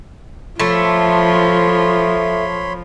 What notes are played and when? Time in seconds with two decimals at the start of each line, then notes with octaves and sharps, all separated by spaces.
0.60 F3 A3 C#5 B5 C6